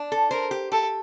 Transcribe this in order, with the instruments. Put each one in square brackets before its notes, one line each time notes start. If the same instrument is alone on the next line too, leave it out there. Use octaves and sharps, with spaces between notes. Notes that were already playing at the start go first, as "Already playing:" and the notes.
Already playing: [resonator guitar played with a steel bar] D4
A4
[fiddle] A#4 [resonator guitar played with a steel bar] C5
[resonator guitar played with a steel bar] G4
[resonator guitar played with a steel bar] G4 [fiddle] A4